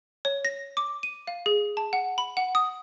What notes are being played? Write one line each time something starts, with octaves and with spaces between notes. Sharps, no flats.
C#5
A#6
D6
D#7
F5
G#4
A5
F#5
B5
F#5
D#6